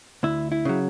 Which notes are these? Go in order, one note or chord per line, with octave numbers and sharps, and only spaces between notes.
D2 E4
E4
C#3 F#3